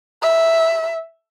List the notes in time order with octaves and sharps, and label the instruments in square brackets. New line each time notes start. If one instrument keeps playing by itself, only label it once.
[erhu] E5